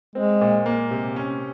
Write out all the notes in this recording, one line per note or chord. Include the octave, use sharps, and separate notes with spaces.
G#3 C4
A#2
A#3
C3
C#4